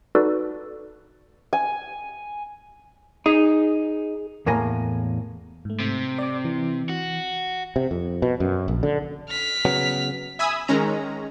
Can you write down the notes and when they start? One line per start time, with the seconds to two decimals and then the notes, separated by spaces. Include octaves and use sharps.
0.15 D#4 F#4 A4 B4 D5
1.53 G#5
3.26 D#4 G#4
4.46 E2 A2 A#3 G#5 A#5
5.65 G#2 A3
5.80 C3
6.18 D5 D6
6.45 E3
6.89 F#4
7.76 C3
7.91 F2
8.22 B2
8.40 F#2
8.68 A#1
8.83 D3
9.29 F6 B6
9.65 C#3 F#3 B3
10.39 E5 G#5 B5 D#6 E6
10.68 D#3 G#3 C#4 A#5